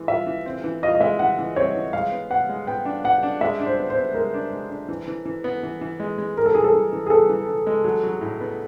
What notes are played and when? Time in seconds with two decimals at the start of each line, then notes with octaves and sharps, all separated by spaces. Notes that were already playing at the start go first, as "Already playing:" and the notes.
Already playing: E3 G#3
0.08 F4 E5
0.26 E3
0.46 C4
0.64 E3
0.83 F4 D#5
0.95 D#5
1.01 G#3 E5
1.19 E3 F#5
1.38 E3
1.56 C4 C#5
1.75 E3
1.93 G#3 F5
2.12 B3
2.30 B3 F#5
2.49 G#3
2.67 B3 G5
2.85 D4
3.04 B3 F#5
3.23 D4
3.41 G#3 E5
3.60 D4
3.66 C5
3.79 B3
3.90 C5
3.97 B3
4.14 G#3 A#4
4.34 D4
4.52 G#3
4.70 D4
4.88 E3
5.07 E3
5.25 E3
5.44 B3
5.63 E3
5.81 E3
6.00 G#3
6.18 G#3
6.37 G#3 A#4
6.46 A4
6.55 E3 G#4
6.64 A4
6.74 E3
6.92 E3
7.06 G#4
7.10 B3 A4
7.29 E3
7.48 E3
7.67 G#3
7.84 F#3
8.03 F#3
8.21 A2
8.41 B3